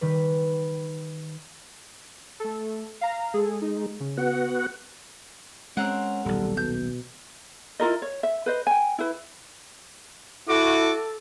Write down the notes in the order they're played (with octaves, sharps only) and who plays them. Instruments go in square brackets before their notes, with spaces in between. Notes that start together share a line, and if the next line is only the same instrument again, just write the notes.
[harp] D#3 G3 B4
[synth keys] A3 A4
F5 A#5
[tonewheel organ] G#3 [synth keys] G#4 A4
[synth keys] D#4
C#3
[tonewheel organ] B3 F#4 F#5
[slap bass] G#3 [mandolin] C4 A#4 F#5 [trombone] C#4
[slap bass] D#1 B1 [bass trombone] G3 [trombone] A4
[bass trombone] B2 [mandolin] G6
[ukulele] E4 F4 A#4 D#5
C#5
E5
B4 C5 D#5
G5 G#5
E4 B4
[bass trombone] E4 [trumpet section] F#4 D6 [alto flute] A4